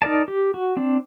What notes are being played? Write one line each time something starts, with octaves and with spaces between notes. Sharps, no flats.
D#4 A#4 D5 A5
G4
F#4
C4 D4